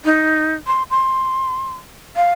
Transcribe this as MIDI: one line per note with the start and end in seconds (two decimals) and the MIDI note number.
0.05 0.54 63
0.67 0.83 84
0.90 1.73 84
2.16 2.33 77